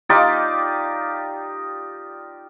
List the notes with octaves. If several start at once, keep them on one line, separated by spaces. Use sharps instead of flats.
D#4 F4 G4 D5